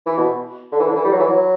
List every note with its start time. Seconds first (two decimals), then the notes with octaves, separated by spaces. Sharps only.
0.06 E3
0.17 B2
0.72 D3
0.80 E3
0.88 D3
0.96 E3
1.04 G3
1.12 F#3
1.19 E3
1.27 F#3